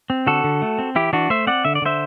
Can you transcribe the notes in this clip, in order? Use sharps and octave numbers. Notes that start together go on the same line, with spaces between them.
C4
D3 F#4 A4
D3
A3
C4
E3 E4 G4
E3 D4 F#4
A3 C5 E5
C4 D5 F#5
D3 E5
D5
D3 C5 E5